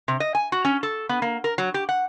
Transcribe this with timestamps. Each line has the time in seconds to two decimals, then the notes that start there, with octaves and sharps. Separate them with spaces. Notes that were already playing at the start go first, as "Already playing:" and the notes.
0.08 C3
0.20 D#5
0.35 G#5
0.52 F#4
0.65 C#4
0.83 A4
1.09 B3
1.22 A#3
1.44 A#4
1.58 F#3
1.74 G4
1.89 F#5